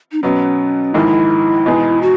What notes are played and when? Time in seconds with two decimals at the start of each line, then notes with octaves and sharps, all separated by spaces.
0.12 D#4
0.23 B2 F#3 B3 C#4
0.94 A#1 G#2 D#3 G#3 E4
1.66 E2 B2 G#3 D#4 G#4
2.02 F#4